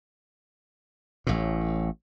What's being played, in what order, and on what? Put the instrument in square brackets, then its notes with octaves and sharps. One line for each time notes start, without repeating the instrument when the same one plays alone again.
[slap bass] A1 A2